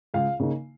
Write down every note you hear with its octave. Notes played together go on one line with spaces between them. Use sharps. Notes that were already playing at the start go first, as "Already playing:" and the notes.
C#2 F5
C#3 A#3 D#4